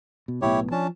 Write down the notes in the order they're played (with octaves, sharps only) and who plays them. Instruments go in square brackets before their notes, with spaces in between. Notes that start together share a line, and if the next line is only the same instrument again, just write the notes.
[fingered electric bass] B2
[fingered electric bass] B1 A2 B3 [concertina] E4 G4 C#5
[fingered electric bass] F3 [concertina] C#4 D4 A5